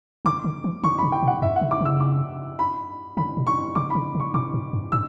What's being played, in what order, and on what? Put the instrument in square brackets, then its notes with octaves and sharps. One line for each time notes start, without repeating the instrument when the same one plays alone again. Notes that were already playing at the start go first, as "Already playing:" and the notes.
[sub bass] D3 [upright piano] D6
[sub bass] D3
E3
[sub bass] D3 [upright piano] C#6
[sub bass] C#3 [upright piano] B5
[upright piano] G5
[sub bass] B2
[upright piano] F#5
[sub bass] F#2 [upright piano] E5
[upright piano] F#5
[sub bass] C#3
[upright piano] D6
[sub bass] C#3 [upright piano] E6
[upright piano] D6
B5
[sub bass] D3 [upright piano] B5
[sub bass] B2
[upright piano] C#6
[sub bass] C#3 [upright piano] D6
[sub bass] C#3 [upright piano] B5
[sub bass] C#3
[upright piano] C#6
[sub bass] B2 [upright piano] D6
[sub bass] A2
G2
[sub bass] A2 [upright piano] E6